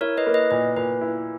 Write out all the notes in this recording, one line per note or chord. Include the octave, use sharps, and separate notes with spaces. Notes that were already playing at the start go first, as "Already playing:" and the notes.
E4 A#4 C#5
B4 D#5
A#3
B4 D#5
A#2 B4
A#2 B4
E4